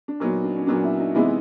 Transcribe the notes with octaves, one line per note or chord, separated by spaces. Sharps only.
D4
A#2 F#3 B3 D#4
D4
C#4
A#2 F#3 B3 D4
E4
D#4
C3 E3 G#3 B3 D#4 E4